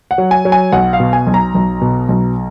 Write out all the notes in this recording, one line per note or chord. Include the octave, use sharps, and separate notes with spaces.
F#5
F#3
G#5
F#3
G#5
B1 F#5
F5
B2
G#5
B1
A#5
B1
B2
B1